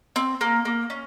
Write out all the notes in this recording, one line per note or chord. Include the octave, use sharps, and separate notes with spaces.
C4
A#3
A#3
C#4